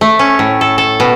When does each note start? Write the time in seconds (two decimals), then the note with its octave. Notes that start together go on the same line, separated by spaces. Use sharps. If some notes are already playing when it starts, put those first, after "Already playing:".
0.01 A3
0.19 C#4
0.39 A2
0.61 A4
0.78 A4
1.00 B2